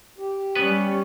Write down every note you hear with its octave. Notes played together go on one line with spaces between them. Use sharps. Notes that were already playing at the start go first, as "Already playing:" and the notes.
G4
G3 B3 C#4 B4